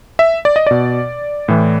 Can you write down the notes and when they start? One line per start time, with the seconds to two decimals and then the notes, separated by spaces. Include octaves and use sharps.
0.19 E5
0.45 D5
0.56 D#5
0.67 B2 D5
1.48 A2 E3